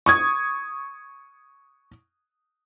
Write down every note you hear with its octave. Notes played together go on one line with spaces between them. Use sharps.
C#6 D#6 G#6